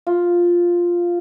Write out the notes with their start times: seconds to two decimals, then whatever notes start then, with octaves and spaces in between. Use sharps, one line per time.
0.07 F4